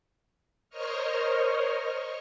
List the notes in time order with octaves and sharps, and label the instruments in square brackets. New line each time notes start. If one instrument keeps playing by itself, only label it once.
[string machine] A#4 C5 C#5 D#5 C#6 F6